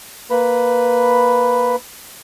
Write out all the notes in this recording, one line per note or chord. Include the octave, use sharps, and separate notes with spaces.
A#3 B4 B5